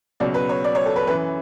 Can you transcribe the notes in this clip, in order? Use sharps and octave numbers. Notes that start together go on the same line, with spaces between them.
C#2 B2 F#3 D5
B4
C#5
D5
C#5
A4
B4
F#2 E3 B4